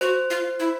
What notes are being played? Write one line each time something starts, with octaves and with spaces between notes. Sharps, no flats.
F#4 C5
F4
E4